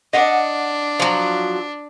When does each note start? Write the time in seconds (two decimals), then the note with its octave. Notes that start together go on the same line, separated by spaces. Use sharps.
0.13 D4 D#5 F#5
1.00 F3 F#3